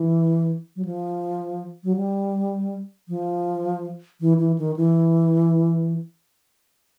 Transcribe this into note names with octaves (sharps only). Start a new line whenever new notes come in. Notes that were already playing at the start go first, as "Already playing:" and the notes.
Already playing: E3
F#3
F3
F#3
G3
F3
E3
E3
D#3
E3